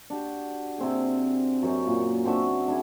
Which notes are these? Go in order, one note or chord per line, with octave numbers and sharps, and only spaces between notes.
D4 F#4 G4
C3 C4 G#4
F#2 C3 C#4
A#2
C4 D4 F#4 E5
D4 E4 G#4